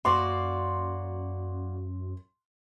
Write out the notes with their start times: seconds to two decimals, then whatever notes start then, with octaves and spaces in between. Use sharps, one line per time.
0.05 F#2 A#3 F#4 D5 C6